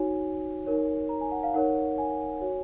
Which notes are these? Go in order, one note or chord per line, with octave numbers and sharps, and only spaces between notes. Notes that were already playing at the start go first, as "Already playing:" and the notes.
Already playing: D#4 F#4 C#5 G#5
D#4 A#4 C#5
A#5
G#5
F#5
F5
D#4 A#4 C#5 F#5
G#5
F#4 C#5